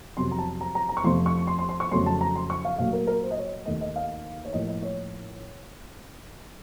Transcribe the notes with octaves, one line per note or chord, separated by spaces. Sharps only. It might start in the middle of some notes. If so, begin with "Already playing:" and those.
F2 C3 F#3 C6
A#5
A5
A#5
A#5
A#5
C#6
F2 C3 F3 A3 C6
C#6
C6
C6
C6
C#6
F2 C#3 F#3 A3 C6
A5
A#5
C6
C#6
F5
A#2 F#3 A3 F5
A#4
A#4
C5
D#5
C#5
D#2 D#3 A3 D#5
D#5
F5
C#5
A2 F3 A#3 D#5
D#5
C#5